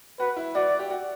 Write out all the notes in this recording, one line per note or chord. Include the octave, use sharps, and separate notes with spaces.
F#4 B4
E4
F#4 D5
G4
F#4